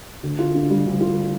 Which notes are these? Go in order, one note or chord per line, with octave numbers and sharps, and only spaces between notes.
D2
F4
D3
G3
D2
F4